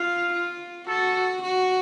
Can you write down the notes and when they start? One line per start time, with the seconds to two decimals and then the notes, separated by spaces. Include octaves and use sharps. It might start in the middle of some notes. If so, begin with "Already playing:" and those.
Already playing: F4 F5
0.33 F4
0.88 F#4 A4
1.42 F#4